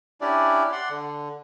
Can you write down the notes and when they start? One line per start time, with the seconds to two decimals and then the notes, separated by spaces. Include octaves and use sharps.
0.21 C#4 D4 E4 G4 D5
0.72 D5 F#5 C6
0.90 D3